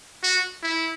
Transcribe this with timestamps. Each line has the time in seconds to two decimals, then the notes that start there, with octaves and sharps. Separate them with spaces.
0.23 F#4
0.63 E4